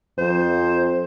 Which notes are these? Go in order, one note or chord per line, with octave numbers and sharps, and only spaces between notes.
F2 C5